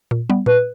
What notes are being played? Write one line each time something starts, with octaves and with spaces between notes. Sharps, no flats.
A#2
G3 B3
A#2 B4